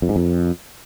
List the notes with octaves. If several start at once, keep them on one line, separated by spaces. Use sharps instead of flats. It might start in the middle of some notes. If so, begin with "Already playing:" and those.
F2
G#2
F2